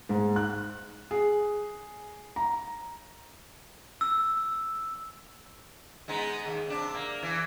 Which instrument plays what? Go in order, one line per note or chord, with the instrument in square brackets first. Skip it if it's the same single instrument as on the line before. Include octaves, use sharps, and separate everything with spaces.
[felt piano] G#2
F#6
G#4
A#5
[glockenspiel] E6
[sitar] G#3 B3 D#4
D#2
C3 D4
A#3
E3